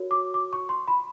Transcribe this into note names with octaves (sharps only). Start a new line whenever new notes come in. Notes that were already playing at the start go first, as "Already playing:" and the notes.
Already playing: F#4 A#4 C#5
D6
D6
C#6
C6
B5